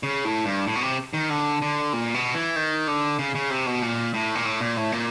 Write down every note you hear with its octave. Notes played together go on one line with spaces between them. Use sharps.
C#3
A2
G2
A2
B2
C3
D#3
D3
D3
A#2
B2
E3
D#3
D3
C#3
C#3
C3
B2
A#2
A2
A#2
A2
A#2
A2
A#2